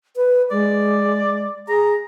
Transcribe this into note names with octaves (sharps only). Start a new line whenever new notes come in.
B4
G#3 D5
G#4 A#5